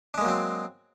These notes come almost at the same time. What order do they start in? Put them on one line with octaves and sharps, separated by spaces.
D4 G#3 A#3 F#3 C4